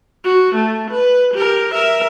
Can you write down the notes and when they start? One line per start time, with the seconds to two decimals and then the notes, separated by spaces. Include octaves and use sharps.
0.24 F#4
0.55 A3
0.91 B4
1.34 G4 A#4
1.74 A#4 E5